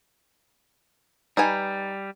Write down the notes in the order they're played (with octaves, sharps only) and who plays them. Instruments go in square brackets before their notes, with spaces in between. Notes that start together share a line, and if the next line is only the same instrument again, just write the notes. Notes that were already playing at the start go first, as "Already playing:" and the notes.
[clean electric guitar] G3 [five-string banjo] D#4 B4 G#5